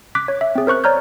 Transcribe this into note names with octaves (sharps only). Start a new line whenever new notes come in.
D6 F#6 B6
C#5
E5
C4 G#4
A#4 C5 C#6 F#6
C#5 D5 A#5 F6 G6